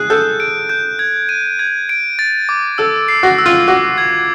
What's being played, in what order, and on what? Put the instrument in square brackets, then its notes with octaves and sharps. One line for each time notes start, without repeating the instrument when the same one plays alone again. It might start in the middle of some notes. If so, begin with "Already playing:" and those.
Already playing: [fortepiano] G#4 [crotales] F#6
[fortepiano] A4 [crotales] G6
[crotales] D7
G6
G#6
D#7
G#6
D7
A6
D6
[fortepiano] A4 [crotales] E6
[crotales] C7
[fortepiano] F#4
[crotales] E6
[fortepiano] F4
[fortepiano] F#4 [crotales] D6
[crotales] G#6